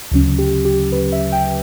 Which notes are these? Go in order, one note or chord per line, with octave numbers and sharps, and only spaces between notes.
D2 C#3 F#3 C#4
G4
G4
B4
E5
G5